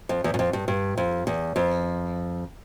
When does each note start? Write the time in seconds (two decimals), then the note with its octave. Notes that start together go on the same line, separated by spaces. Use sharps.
0.09 F2
0.24 E2
0.34 F#2
0.39 F2
0.53 G2
0.68 G2
0.97 F2
1.27 E2
1.56 F2